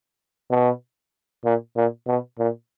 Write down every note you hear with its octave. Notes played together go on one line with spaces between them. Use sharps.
B2
A#2
A#2
B2
A#2